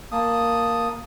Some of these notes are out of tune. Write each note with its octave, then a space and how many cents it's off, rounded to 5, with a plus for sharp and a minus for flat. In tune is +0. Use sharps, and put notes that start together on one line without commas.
A#3 +0 A5 +0 D#6 +0